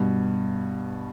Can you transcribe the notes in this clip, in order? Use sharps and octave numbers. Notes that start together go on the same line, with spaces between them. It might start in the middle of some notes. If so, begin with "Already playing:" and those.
Already playing: G2 B2